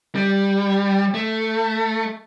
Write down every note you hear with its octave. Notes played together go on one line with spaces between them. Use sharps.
G3
A3